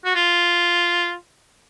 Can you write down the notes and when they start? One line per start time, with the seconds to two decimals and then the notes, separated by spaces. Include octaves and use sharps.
0.05 F#4
0.15 F4